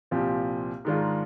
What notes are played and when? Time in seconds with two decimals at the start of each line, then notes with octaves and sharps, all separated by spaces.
0.11 C2 A#2 F3 C4 G4
0.85 G#2 D#3 G#3 D4 F4